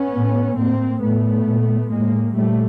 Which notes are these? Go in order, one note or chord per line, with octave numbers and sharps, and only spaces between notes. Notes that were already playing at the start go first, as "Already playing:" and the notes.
Already playing: B3 C#4
A2
A2 A#3 C4
A2 A3 B3
A#2
A2 G#3 A#3
A#2 G3 A3